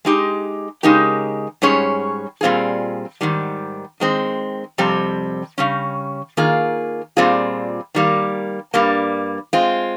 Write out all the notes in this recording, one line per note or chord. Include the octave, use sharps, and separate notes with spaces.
G#3 D#4 G4
C#3 G#3 D#4 G4 A#4
G#2 G3 C#4 G#4 C#5
A#2 G3 C4 F4 G#4
G#2 D#3 G3
D#3 G#3 C4
F2 C3 G3 C4
C#3 G3 C#4
D#3 A#3 F4 G#4
A#2 G3 C4 F4 G#4
D#3 G3 A#3
G2 G3 A#3
G#3 C4 F4